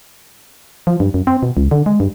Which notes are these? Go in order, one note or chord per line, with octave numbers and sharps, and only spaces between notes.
F3
G2
F#2
C4
B2
C#2
D3
G#3
G2